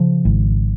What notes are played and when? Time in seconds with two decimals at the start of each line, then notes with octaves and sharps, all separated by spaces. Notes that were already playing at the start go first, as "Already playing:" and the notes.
Already playing: C#3 F3
0.25 G#1